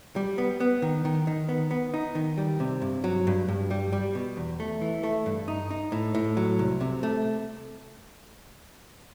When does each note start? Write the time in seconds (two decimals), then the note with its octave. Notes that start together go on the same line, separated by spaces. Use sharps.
0.16 G3
0.38 B3
0.60 B3
0.82 D#3
1.05 D#3
1.27 D#3
1.49 B3
1.71 B3
1.94 D#4
2.15 D#3
2.38 G3
2.60 C3
2.82 G2
3.04 F#3
3.27 G2
3.48 G2
3.71 G3
3.92 G3
4.15 B2
4.37 E2
4.60 A3
4.81 E3
5.03 A3
5.26 G2
5.48 D#4
5.71 D#4
5.92 A2
6.15 A2
6.37 F#3
6.59 C2
6.81 C3
7.03 A3